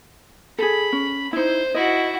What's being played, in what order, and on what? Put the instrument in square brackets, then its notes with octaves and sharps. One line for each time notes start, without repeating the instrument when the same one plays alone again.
[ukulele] G#4 A4 [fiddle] B5
[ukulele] C#4
[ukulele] D#4 E4 [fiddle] C5
[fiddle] E4 F#4 [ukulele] D#5